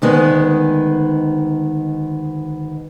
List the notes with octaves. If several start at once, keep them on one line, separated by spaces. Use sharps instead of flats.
D2 D#3 G#3 B3